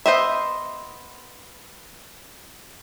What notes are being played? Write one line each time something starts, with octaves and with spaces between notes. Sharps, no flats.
B3 C5 D#5 E5